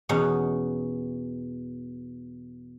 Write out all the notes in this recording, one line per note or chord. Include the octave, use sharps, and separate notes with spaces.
E2 B2 C#4 D#4 F#5